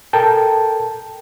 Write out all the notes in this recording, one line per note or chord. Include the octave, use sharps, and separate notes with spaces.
A4 A#4 G5 A5